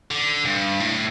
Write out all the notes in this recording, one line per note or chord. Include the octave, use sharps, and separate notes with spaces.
D3
G2
A2